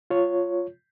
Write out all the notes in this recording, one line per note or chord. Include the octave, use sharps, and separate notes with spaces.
F4 C#5